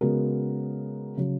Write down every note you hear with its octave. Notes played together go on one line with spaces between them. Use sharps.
C#3 G#3 B3 F#4 A#4
C#3 F#3